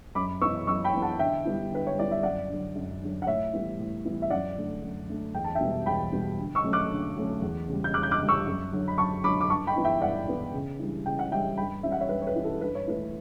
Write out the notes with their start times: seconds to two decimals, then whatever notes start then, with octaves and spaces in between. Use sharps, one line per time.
0.15 F#2 B5 D6
0.41 B3 C#6 E6
0.45 E3
0.67 F#2 C#6 E6
0.84 G5 B5
0.93 E3 B3
1.02 F#5 A5
1.19 D3 E5 G5
1.45 G3 B3 E4
1.71 D3 B4
1.87 C#5
1.97 G3 B3 E4 D5
2.11 E5
2.23 F#2 D5 F#5
2.49 D3 F#3
2.75 F#2
3.01 D3 F#3
3.22 F#5
3.27 A2 C#5 E5
3.53 E3 G3 B3 E4
3.79 A2
4.05 E3 G3 B3 E4
4.22 E5
4.30 F#2 D5 F#5
4.56 D3 A3
4.83 F#2
5.09 D3 A3
5.35 E2 G5
5.44 A5
5.55 E5 G5
5.60 B2 G3 B3
5.86 E2 G5 B5
6.12 B2 G3 B3
6.38 D3
6.55 C#6 E6
6.64 F#3 A3 C#4
6.73 D6 F#6
6.91 D3
7.16 F#3 A3 C#4
7.42 E2
7.68 C#3 G3
7.84 G6
7.94 E2 D6 F#6
8.03 G6
8.11 D6 F#6
8.20 C#3 G3
8.28 C#6 E6
8.46 F#2
8.72 D3 F#3
8.88 B5
8.98 F#2 A5 C#6
9.24 D3 F#3 B5 D6
9.41 D6
9.50 G2 A5 C#6
9.67 G5 B5
9.76 E3 B3 E4
9.84 E5 G5
10.01 G2 D5 F#5
10.27 E3 B3 E4
10.54 C#3
10.79 E3 G3 D4
11.05 C#3 G5
11.19 F#5
11.31 E3 G3 D4 E5 G5
11.57 G2 G5 B5
11.83 E3 G3 C#4 E4 E5
11.92 F#5
12.00 C#5 E5
12.09 G2 B4
12.22 C#5
12.27 B4
12.35 E3 G3 C#4 E4
12.44 A4
12.61 G2 B4
12.75 C#5
12.87 E3 A3 E4 B4